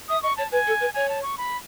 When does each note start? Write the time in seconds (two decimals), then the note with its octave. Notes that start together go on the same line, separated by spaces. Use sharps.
0.09 E5 D#6
0.22 D#5 C#6
0.37 C#5 A5
0.51 B4 G#5
0.66 A4
0.80 B4
0.94 C#5 G#5
1.09 A5
1.23 C#6
1.38 B5